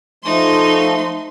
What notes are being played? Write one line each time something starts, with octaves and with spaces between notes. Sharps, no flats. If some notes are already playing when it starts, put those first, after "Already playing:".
F3 A3 D#4 C6